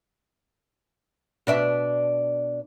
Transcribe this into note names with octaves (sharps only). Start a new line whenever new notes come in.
B2 D4 E5